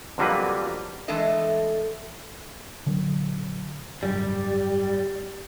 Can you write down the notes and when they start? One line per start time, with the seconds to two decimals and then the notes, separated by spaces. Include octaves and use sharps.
0.18 F2 D3 F#3 G3 A#3 B4
1.08 E3 G#3 A3 D4 A4 D#5
2.86 A#1 D3 F#3
4.03 G#1 F#2 G3